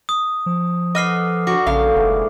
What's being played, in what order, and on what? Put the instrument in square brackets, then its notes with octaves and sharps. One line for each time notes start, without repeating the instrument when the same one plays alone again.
[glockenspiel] D#6
[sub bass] F3
[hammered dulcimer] A4 B4 F#5 [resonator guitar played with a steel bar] D#5 [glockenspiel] D6 F6 C7
[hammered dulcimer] D3 B4 D5 [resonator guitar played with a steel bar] F#4 [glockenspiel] D6
[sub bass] A#1 [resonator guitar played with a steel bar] C#3 F5 [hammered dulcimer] A#3 A4
[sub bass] F1 [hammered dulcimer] G#2 D3 E3